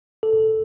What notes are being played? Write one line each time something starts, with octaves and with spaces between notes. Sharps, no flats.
A4